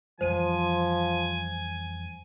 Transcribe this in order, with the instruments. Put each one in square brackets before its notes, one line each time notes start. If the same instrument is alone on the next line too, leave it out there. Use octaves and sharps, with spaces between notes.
[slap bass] F2 E3 G3 [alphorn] F3 [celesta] C5 D#7 [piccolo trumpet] G#5